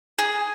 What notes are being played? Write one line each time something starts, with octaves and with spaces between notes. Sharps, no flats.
G#4